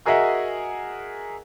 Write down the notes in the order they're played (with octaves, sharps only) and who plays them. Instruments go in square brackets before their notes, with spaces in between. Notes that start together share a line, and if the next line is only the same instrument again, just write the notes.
[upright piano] F#4 G#4 A#4 D#5 E5 F#5